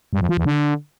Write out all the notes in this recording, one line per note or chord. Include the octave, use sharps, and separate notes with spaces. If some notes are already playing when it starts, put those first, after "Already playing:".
G2
F2
F3
E2
D3